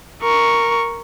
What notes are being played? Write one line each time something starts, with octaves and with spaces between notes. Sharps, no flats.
A#4 C#6